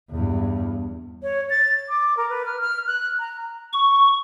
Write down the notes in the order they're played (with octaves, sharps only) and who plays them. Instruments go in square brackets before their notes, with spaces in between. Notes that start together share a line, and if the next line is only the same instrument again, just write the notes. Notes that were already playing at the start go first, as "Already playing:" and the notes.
[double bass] E2 G2
[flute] C#5
A6
D6
A#4
B4
F6
F6
F#6
A#5
[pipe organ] C#6